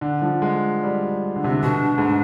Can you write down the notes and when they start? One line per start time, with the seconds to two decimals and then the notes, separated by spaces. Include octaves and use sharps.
0.01 D3
0.22 F3
0.42 G#3
0.83 G3
1.36 D3
1.44 C3
1.51 D3
1.63 B2 D4
1.98 G#2